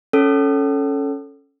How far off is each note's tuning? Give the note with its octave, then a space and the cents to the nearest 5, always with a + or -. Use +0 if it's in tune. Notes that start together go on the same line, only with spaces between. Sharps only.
C#4 +0 A4 +0 E6 +25